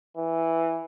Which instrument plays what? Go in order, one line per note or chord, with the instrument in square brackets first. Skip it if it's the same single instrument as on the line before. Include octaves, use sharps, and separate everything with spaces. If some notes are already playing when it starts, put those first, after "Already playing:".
[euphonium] E3